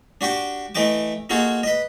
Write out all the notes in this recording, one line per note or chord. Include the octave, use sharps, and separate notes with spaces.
D4 F#4 G4 G5
E3 A3 D#5 G5 D6
A#3 D#4 F4 F#4 G#4 A4
B4 D#5